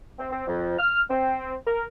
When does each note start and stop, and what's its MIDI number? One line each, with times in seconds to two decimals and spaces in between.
0.19 0.28 60
0.31 0.45 60
0.47 0.76 41
0.79 1.01 89
1.10 1.54 60
1.66 1.83 70